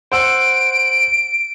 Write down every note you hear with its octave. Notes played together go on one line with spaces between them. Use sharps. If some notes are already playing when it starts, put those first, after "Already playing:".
C5 F#5 E6 D7